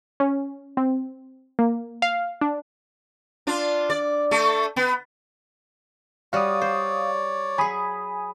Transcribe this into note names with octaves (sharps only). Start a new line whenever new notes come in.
C#4
C4
A#3
F5
D4
D4 F4
D5
A3 A4
B3
G3 F#4 C#5 D5 F5 D#6
C5
F#3 G#4 G#5 B5 D#6